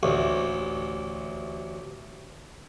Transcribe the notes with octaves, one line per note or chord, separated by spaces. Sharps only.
A1 D2